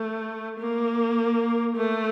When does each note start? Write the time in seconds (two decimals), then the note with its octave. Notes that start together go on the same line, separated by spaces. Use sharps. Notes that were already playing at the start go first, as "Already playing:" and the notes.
Already playing: A3
0.60 A#3
1.76 A3